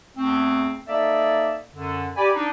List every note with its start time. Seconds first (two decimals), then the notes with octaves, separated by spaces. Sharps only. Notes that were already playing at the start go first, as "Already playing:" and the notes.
0.17 E2 A3 C4
0.88 A#3 D#4 A4 D5 E5
1.74 F#2 D3
2.17 G4 D5 G#5 B5
2.34 D4 D#4